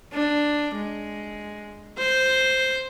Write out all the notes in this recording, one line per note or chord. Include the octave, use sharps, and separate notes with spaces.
D4
G#3
C5